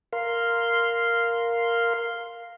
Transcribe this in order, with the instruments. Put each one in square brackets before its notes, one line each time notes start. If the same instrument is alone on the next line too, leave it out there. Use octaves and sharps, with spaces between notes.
[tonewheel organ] A#4 F5 C6